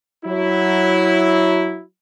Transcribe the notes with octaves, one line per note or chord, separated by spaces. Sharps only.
F#3 E4